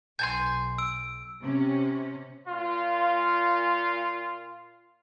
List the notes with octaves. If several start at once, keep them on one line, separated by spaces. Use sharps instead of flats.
B1 G#5 A5 C6 G6
E6 D7
C3 C#4
A#2 F4